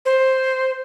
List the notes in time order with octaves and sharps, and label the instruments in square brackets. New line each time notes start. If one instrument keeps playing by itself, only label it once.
[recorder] C5